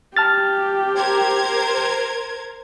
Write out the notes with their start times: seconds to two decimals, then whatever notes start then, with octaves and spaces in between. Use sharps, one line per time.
0.17 G4 A5 F6 A6
0.97 A#4 C5 G#6